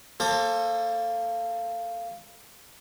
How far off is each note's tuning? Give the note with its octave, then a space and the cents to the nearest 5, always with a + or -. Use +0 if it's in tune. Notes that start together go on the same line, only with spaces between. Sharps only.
A#3 -15 A4 +10 C5 +35